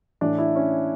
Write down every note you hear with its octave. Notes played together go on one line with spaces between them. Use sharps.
A2 E3 D4
E4
C#4